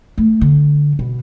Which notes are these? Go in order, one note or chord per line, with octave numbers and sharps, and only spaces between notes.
A3
D3
B2